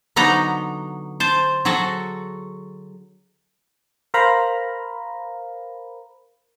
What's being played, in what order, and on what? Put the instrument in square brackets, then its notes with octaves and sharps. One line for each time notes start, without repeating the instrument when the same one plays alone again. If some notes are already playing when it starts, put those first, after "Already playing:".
[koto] D3 F#3 B3 D#4 A#5
C5 A5
F#3 F#4 G#4 A4
[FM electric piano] A#4 C5 F5 A#5 B5